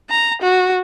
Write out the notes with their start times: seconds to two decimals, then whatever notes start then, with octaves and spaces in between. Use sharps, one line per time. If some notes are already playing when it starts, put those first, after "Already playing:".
0.10 A#5
0.42 F#4